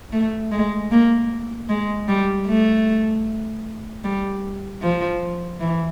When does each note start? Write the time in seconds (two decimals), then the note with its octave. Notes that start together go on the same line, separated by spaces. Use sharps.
0.13 A3
0.52 G#3
0.91 A#3
1.69 G#3
2.08 G3
2.47 A3
4.04 G3
4.82 F3
5.60 E3